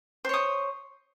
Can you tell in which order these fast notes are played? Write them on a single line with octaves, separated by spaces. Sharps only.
C5 C#5 D#6